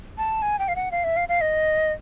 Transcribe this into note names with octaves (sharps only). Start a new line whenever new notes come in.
A5
G#5
G5
F5
F#5
F5
E5
F5
F5
D#5